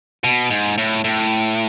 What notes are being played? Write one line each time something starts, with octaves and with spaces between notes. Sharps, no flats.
B2
G#2
A2
A2